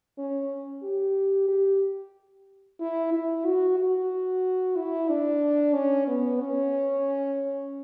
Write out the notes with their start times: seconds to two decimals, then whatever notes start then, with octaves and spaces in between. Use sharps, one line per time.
0.18 C#4
0.83 G4
1.48 G4
2.80 E4
3.13 E4
3.46 F#4
3.78 F#4
4.77 E4
5.09 D4
5.74 C#4
6.08 B3
6.40 C#4